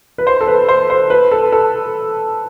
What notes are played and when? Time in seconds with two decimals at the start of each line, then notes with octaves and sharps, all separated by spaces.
0.18 B4
0.27 C5
0.41 A4
0.47 B4
0.68 C5
0.90 C5
1.10 B4
1.32 A4
1.52 A4